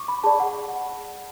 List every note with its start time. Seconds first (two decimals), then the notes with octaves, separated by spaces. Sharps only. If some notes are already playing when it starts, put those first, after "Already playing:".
Already playing: C#6 D6
0.08 B5
0.23 G#4 D5 A5
0.40 F#5